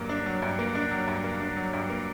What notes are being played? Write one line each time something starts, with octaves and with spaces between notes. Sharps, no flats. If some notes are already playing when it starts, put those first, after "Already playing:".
Already playing: G2 F#3 A#3
D4
F#3
G2
A#3
D4
F#3
G2
A#3
D4
F#3
G2
A#3